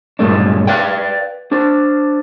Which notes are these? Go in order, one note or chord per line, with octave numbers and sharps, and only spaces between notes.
B1 G2 A#2 A3 D4
B4 D5 F5 G5
D4 C5